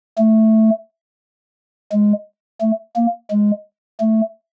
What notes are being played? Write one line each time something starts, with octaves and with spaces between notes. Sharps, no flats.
A3
G#3
A3
A#3
G#3
A3